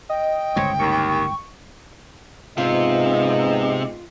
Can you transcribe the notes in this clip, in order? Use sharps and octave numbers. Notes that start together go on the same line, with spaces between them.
D#5 G5
G1 C#2 A2 C4 C#5
D#2 C#6
G#2 C3 B3 F4 D#5